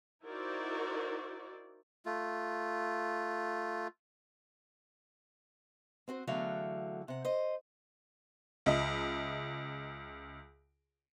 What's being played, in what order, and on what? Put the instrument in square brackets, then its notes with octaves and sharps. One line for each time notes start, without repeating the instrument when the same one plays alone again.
[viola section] D#4 E4 F#4 A#4 C5 D5
[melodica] A3 F4
[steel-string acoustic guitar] C4 F#4 C5
E2 D3 F#3 A3 F#4 F5
C3 F#5
C5 D#5
[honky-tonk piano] C#2 D#5 E5